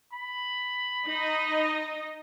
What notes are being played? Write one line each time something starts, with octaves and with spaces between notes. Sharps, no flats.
B5
D#4 D#5